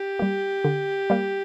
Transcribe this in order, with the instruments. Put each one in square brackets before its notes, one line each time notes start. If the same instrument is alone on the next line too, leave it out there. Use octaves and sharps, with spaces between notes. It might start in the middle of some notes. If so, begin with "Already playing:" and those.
Already playing: [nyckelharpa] G4
[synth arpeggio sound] G3 A#3
D3
G3 A#3